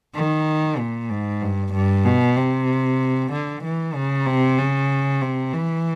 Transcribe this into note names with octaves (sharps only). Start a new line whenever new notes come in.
D#3
A#2
G#2
G2
G2
B2
C3
D3
E3
C#3
C3
C#3
C3
E3